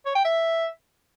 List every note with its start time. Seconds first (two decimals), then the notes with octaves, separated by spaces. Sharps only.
0.05 C#5
0.15 G5
0.25 E5